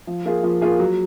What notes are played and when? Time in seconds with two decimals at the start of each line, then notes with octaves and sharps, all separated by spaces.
0.07 F3
0.26 A#3 F4 G#4
0.43 F3
0.61 A#3 F4 G#4
0.79 F#3